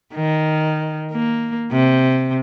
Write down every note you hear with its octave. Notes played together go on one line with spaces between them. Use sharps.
D#3
A#3
C3